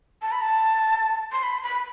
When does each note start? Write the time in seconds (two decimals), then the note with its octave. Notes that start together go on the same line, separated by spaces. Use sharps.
0.22 A5
0.32 B5
0.41 A5
1.32 C6
1.43 B5
1.58 C6
1.63 B5